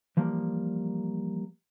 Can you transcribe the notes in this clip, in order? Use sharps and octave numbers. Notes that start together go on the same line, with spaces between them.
E3 F3 G3 A#3